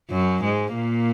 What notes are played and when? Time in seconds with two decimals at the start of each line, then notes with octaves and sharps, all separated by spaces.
0.10 F#2 F#3
0.42 G#2 G#3
0.75 A#2 A#3